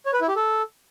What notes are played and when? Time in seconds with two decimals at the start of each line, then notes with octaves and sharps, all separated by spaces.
0.06 C#5
0.13 B4
0.21 E4
0.28 G4
0.36 A4